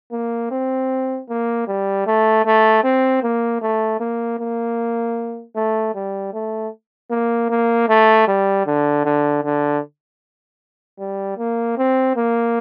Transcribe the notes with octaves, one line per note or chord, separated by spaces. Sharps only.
A#3
C4
A#3
G3
A3
A3
C4
A#3
A3
A#3
A#3
A3
G3
A3
A#3
A#3
A3
G3
D3
D3
D3
G3
A#3
C4
A#3